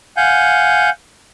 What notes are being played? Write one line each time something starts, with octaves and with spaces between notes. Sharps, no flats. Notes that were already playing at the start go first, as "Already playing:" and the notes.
F5 F#5 G#5 G6